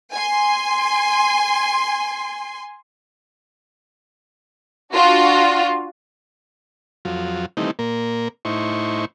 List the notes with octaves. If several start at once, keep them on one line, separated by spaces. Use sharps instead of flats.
G#5 C6
D4 F4 F#4
F2 F#3 F4
D#3 E3 G3 A3 C4 D#4
A#2 A#3 A#4
A2 D#4 E4 C5 C#6